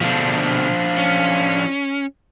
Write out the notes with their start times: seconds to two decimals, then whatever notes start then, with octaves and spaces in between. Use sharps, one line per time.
0.01 B2 D3 F3 D4
0.97 C#4